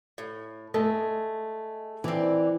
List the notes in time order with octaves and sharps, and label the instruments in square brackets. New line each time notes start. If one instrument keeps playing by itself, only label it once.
[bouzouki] A2
[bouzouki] G#3 [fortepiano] A3
[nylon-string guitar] E3 [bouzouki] C4 D5